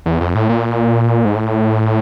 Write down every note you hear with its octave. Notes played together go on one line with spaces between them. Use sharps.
E2
F2
A2
A#2
G#2
A2